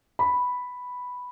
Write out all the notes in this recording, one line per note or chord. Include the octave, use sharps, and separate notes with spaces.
B5